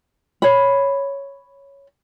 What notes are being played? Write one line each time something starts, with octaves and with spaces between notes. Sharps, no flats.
C#5 B5